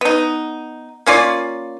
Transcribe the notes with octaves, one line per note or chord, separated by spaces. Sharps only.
B3 D#4
A#3 C#4 F4 D5